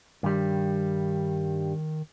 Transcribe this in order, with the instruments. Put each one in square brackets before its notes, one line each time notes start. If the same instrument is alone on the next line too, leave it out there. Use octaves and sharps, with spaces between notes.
[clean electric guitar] G2 G3 [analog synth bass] D#3